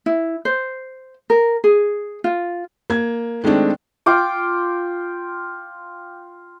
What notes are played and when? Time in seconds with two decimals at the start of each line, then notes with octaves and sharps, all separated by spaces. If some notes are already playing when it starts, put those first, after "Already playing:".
0.06 E4
0.45 C5
1.30 A#4
1.64 G#4
2.24 F4
2.90 A#3 G#6
3.44 D#3 G#3 A3 C4 D4
4.06 F4 G5 D6